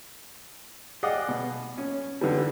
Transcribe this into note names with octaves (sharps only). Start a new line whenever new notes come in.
G4 G#4 D5 D#5 F5 F#5
B2
C#4
D3 E3 G3